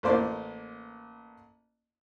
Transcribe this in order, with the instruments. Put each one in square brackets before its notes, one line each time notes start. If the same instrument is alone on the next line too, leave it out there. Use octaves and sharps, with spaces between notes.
[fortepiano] A1 A#3 C5 D5